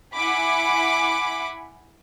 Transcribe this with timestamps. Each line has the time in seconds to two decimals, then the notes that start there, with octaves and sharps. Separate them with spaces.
0.15 E4 F#5 G#5 B5 D6